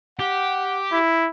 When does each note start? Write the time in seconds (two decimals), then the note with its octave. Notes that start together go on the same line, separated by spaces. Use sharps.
0.19 G4 F#5
0.92 E4